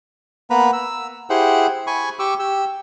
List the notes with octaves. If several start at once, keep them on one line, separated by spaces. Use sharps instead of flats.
A#3 B3 B4 A#5 B5
E6
E4 G4 G#4 C5 F#5
G#5 B5 C#6
G4 C#6 D6 E6
G4 E6